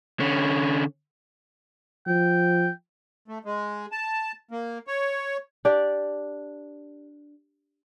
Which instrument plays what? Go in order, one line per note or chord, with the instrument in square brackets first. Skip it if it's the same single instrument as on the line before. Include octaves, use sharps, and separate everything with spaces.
[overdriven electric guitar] D3 C#4
[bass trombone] F3 [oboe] G5
[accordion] A3
G#3
A5
A#3
C#5
[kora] D4 G4 D5